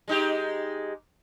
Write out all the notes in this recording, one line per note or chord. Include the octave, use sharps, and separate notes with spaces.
G#3 D#4 G4